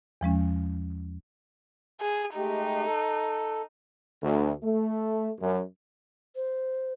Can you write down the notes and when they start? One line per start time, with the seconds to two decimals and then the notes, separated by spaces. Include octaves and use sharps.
0.21 E2 F3 G#3 C#4
2.01 G#4
2.36 G#3 A3 D#4 G4
2.86 A4
4.22 D2
4.62 A3
5.40 F#2
6.36 C5